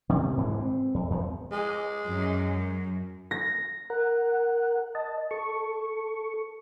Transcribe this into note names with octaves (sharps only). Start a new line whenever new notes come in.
C3 D#3
G#2 E3 G#3
C4
F2
E2 F3
G#3
F#2
A#6
A#4 F#5
D#5 A5
A4 C#6